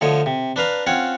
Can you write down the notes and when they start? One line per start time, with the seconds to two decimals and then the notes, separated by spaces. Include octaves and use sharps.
0.01 D2 D3 F3 C#5 D#5
0.26 C3
0.56 D4 B4 F5 A#5
0.86 C4 C#4 F4 C#5 F#5